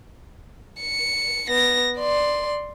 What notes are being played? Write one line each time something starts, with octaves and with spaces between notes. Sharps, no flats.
C#7
B3 A#6
D5 C6